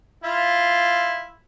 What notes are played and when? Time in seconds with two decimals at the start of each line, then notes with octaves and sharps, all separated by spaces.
0.24 E4 F4